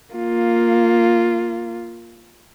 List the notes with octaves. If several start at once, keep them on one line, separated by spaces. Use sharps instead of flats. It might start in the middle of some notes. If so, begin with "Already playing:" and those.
A#3 F4